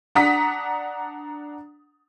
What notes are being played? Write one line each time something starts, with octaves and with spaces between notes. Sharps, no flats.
D4 F#5 A#5 D#6 B6